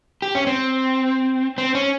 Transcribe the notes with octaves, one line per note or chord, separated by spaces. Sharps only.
G4
C#4
C4
C4
C#4